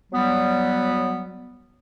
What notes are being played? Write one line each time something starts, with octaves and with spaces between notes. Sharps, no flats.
F#3 G3 B3